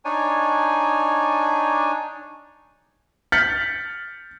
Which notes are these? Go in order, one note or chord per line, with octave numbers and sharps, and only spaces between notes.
D4 D#4 C#5 G#5
F6 G6 A6 B6 C#7 F#7